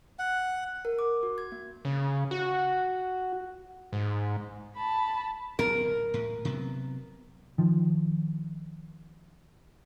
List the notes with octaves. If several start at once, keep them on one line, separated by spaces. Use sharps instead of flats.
F#5
A#4
D6
F#4
G#6
A#3
C#3
F#4
G#2
A5 B5
D1 B1 B3 A#4
A2
C3 F#3 B3
D#3 F3